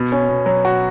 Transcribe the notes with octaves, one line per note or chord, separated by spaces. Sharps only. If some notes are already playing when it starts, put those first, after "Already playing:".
Already playing: B2
C#4
B2
F#3
F#4